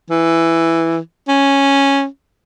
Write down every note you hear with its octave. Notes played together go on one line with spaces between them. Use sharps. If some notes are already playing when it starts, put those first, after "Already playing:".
E3
C#4